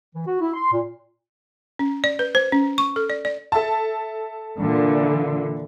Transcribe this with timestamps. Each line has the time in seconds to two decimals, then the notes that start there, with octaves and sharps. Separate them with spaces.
0.14 E3
0.26 F#4
0.40 E4
0.53 C6
0.72 A#2
1.79 C#4
2.04 D5
2.19 B4
2.35 C5
2.52 C#4
2.78 C#6
2.96 A4
3.10 D5
3.25 D5
3.52 A4 E5 A5
4.56 A#2 D3 E3